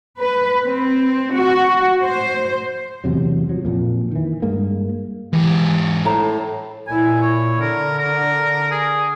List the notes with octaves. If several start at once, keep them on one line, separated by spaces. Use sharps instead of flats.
B4
C4
F#4
C5
A1 E2 C3 F#3
F3 F#3
A#1 F2 A#2
D#3 E3
G2 G#3 A#3
G#2 E3 G4
A2 C5 A#5
A#2 E4 G#5
C#5
D3 A#4
A#4
G#4